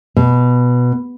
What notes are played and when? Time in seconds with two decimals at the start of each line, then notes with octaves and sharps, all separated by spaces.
0.17 B2